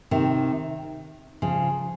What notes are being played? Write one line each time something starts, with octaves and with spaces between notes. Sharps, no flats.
C3 D#3
C#3 F3